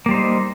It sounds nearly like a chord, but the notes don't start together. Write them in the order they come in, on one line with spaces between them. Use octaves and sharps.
A#3 G3 C5 D#4